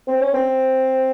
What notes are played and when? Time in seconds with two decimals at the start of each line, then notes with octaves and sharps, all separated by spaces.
0.08 C4
0.21 C#4
0.34 C4